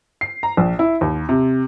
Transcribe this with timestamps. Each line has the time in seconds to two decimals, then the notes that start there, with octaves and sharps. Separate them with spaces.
0.21 C7
0.43 A#5
0.57 A#1
0.79 E4
1.01 D#2
1.29 C3